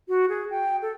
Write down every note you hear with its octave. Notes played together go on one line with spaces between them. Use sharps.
F#4
G#4
G5
A4